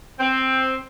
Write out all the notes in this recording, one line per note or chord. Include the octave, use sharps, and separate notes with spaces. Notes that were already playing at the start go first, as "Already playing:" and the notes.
C4